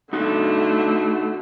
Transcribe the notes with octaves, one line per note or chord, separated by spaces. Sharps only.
D3 A3 D#4 F#4